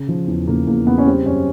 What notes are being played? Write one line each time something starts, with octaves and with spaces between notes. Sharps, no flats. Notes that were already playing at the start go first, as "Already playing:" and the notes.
Already playing: C#3
F3
E2
C#3 A#3
E2 A#3
C#3 B3
C#4
G3 C4
F#2 C#4